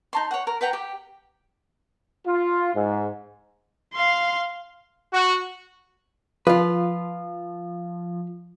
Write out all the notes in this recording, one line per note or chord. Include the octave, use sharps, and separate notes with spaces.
D#4 A5 C6
C#5 F#5
A#4
B4 F#5 G5 A#5
G4
F4
G#2
F5 C6
F#4
F3 F4 B4